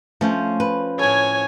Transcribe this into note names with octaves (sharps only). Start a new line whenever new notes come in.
F3 A3 C#4 C5
B4
A2 A4 C#5 G#5